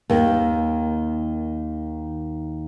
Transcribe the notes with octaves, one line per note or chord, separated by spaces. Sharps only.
D#2 D#3